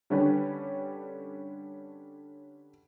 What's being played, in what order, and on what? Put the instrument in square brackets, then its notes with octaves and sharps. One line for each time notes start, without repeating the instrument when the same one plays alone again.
[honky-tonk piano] D3 G3 C#4 D4 G4 B4